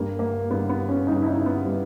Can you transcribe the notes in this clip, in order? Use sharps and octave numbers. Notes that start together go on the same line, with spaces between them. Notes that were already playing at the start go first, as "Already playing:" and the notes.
Already playing: G2 G3 A#3
A#3
G2 G3 B3
B3
C#4
G2 G3 D#4
E4
D#4
B3
G3